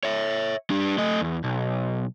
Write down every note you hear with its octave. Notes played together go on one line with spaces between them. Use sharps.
C#5 E5
G3 D4
A3 D#5
E2
B1